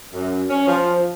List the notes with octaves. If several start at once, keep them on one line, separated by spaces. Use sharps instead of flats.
F#2
C#4
F3